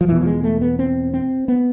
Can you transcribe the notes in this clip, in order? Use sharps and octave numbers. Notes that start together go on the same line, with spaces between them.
F3
E2 B2 E3
F3
G#3
A3
B3
C4
C4
B3